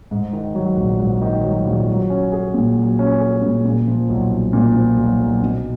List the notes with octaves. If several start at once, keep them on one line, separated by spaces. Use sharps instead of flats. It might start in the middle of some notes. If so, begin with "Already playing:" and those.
G#2
D#3
F#3
A#1
G#2
D#3
F#3
A#1
F#3
C#4
G#4
A#2
F#3
C#4
G#4
A#2
A#2
F3
B1
B1
A#2
F3
B1
B1
B2